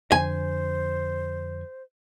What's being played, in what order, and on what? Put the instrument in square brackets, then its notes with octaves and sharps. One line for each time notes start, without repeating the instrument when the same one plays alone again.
[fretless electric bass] F2 D3 [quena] C5 [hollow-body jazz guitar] G#5